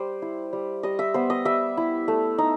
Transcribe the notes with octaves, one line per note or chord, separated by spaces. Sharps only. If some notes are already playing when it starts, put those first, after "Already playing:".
Already playing: G3 C5
E4
G3
G3 D#5
E5
B3 C5
D#5
G3 E5
E4
A3
D#4